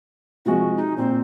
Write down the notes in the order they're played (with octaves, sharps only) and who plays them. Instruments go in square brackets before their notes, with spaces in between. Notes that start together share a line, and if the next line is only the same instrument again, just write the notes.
[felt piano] C3 F3 G#3 [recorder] F#4
[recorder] D#4
[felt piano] A#2 [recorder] C4